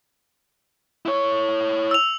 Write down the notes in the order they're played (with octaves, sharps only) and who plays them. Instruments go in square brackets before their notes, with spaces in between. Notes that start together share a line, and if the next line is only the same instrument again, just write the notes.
[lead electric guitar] E4 C#5
[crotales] E6 F7